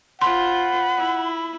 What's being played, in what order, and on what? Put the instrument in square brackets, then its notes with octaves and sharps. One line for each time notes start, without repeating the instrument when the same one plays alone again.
[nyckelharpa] F4 C5 [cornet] F#5 [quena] B5 [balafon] C6
[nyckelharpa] E4